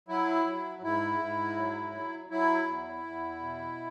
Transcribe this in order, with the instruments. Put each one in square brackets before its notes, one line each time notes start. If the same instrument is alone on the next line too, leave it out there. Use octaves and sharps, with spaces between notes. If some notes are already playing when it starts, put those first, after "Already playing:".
[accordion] F#3 E4
F#3
G#2 E4
G#2
F#3
F#3
F#3 E4
E2
E2
B2